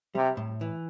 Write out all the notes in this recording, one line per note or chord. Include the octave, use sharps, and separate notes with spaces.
C3 G3
A2
E3